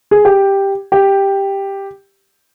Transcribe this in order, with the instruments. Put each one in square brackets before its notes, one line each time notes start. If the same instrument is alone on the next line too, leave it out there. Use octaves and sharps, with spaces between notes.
[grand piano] G#4
G4
G4